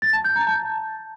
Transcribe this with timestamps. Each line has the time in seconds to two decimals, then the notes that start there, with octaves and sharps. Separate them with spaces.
0.02 A6
0.13 A5
0.24 G6
0.36 A#5
0.47 A5